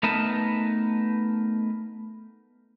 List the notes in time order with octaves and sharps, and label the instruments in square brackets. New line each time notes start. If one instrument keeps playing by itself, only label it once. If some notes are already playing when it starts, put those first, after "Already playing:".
[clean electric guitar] A3 B3 D#4 A#4 B4 A5